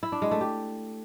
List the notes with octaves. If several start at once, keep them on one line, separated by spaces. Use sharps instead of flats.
E4
D4
G#3
A3
G4